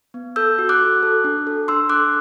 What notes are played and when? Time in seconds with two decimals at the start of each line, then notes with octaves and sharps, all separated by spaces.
0.14 B3
0.36 A4 E6 G6
0.59 F#4
0.69 D6 F#6
0.81 F#4
1.03 A4
1.24 D4
1.47 A4
1.68 D4 C6 E6
1.89 A4 D6 F#6